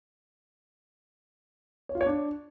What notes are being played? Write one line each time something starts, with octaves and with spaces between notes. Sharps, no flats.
C#5
F4
C#5
D4